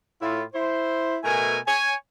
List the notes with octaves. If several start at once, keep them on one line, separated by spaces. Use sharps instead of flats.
A2 E4 F4
E4 C5
B2 A3 A#4 E5 G#5
C#5 G#5